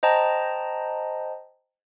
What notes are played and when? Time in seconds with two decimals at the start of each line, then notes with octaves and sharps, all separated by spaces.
0.03 C5 D#5 G5 A5 A#5